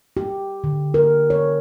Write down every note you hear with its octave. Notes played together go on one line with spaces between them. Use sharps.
G4
D3
A#4
C#5